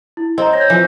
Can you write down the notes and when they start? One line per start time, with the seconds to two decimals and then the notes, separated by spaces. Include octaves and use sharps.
0.17 E4
0.38 C4 D#5 A#5
0.53 C#5 G6 A#6
0.70 E3 F3